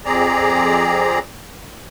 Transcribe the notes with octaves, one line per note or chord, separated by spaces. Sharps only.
F2 C4 G#4 D5 A#5